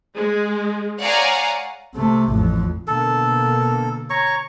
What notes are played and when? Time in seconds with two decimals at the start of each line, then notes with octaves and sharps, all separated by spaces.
0.16 G#3
1.02 C#5 D5 F5 F#5 G#5 A#5
1.95 C3 A3
2.30 A1 F2
2.88 B2 D3 A#3 A4
4.10 C#5 A#5 C#6